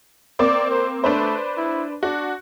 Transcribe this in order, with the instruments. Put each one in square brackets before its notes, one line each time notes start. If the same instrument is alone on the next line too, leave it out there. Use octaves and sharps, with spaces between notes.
[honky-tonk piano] A#3 C4 D6 [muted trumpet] D5
[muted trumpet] C5
[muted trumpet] A3 [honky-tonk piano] D4 B4 C5
[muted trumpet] E4
[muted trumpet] D4 [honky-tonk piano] F#4